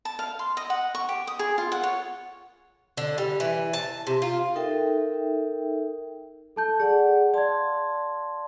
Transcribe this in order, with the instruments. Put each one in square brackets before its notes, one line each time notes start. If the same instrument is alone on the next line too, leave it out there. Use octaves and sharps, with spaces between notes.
[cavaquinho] A5
F5
C6
D#5
F#5
C#6
G4
D#6
G#4
F4
F#5
C#5
[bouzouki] D3
G3
E3
A5
C3
F4
[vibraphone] D#4 A4 A#4 E5 G5
[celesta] A4 A5 G6
[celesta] G#4 [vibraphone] D5 F#5
[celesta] D5 G#6 [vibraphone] F5 A5 C6